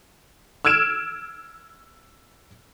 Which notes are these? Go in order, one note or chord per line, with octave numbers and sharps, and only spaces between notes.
E6 F6 G#6 D7 E7